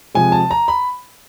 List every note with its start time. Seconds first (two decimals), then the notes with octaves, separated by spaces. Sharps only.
0.15 C3 F3 G#3 G#5
0.32 A5
0.51 A#5
0.68 B5